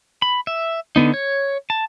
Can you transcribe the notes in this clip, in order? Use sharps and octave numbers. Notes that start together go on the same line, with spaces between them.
B5
E5
D3 B3 D#4
C#5
A5